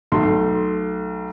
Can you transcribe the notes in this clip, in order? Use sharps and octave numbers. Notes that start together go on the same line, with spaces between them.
B1 A3 C6